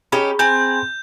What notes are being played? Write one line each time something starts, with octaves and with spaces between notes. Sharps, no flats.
C#4 D#4 G4 G#4 A#5 B5
C4 G#5 G6